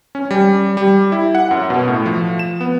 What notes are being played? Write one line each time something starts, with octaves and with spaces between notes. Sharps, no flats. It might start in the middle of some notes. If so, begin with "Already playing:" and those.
C#4
G3
G3
E4
F#5
F#2
B2
A2
F3
E7
B3